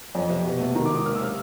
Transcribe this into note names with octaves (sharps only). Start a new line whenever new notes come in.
F2
C3
B2
A3
D#3 A#5
D6
G#2
D#6
A#3 F6
E6
C3 F6